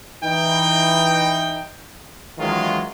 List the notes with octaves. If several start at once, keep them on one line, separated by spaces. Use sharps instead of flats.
E3 D#4 G5
D#3 E3 F#3 G#3 C#4 F4